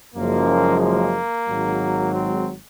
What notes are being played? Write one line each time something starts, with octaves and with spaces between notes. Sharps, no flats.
F#1 F#2 F3 G#3 A#3
A#3
G#1 G#2 F#3
C4